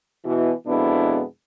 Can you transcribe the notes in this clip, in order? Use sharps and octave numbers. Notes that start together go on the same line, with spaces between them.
B2 E3
F2 B2 G#3 B3 D4 E4